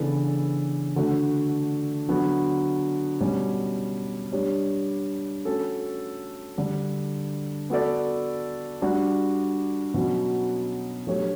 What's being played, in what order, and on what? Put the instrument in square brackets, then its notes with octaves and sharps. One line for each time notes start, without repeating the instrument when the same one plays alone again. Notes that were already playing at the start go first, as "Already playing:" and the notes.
Already playing: [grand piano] C#3 E3 B3 D4 A4
D3 A3 D4 F#4
D3 F#3 B3 F#4
B2 G3 C#4
G3 D4 G4 C#5
A3 C#4 F#4 A4
D3 G3 D4
B3 F#4 A4 D5
G3 D4 F#4
B2 F#3 C#4 F#4
F#3 A3 D4 G4 C#5